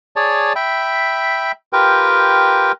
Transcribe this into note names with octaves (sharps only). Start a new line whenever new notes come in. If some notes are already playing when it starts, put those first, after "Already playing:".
G#4 C#5 D5 A5
E5 G5 B5
F4 G4 A#4 B4 G5